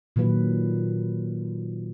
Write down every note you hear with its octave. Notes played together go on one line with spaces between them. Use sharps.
A#2 D#3 F#3 B4